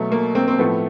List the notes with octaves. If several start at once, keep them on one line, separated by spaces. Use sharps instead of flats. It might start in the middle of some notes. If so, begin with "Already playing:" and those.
Already playing: B2 F#3 A3
A#3
A#3 C4
C4
A2 F3 A3 B3